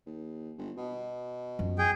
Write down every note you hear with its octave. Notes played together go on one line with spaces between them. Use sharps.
D#2
G1
B2
F#2 F3
G#4 G5